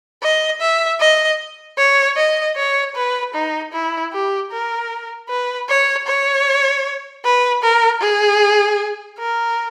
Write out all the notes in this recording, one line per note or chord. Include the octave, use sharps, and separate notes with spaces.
D#5
E5
D#5
C#5
D#5
C#5
B4
D#4
E4
G4
A#4
B4
C#5
C#5
B4
A#4
G#4
A#4